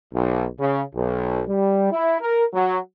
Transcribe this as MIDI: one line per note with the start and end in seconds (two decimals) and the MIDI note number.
0.14 0.46 35
0.59 0.82 49
0.95 1.43 35
1.48 1.88 55
1.92 2.17 64
2.21 2.44 70
2.54 2.78 54